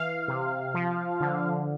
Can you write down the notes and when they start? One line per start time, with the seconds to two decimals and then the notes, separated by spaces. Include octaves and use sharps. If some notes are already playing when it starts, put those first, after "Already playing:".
Already playing: E3 F5
0.28 C3
0.74 F3
1.21 D3